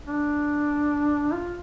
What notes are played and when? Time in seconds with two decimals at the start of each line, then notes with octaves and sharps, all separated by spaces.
0.07 D4
1.33 F4